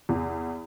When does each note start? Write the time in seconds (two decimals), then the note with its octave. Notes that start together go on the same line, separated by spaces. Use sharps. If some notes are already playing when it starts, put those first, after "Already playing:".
0.09 E2